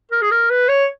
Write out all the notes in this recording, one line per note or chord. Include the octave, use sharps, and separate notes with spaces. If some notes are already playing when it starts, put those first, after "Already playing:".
A#4
G#4
A#4
B4
C#5